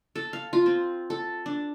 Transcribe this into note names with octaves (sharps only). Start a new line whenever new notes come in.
A4
F5
F4
C4
A4
D4